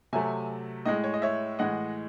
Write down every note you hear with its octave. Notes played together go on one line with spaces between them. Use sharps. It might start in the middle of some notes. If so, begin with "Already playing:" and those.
C3 F#3 A3 E5 G#5
A2 G#3 D#5
C#5
D#5
C#5 E5
A2 E3 G#3 D#5 F#5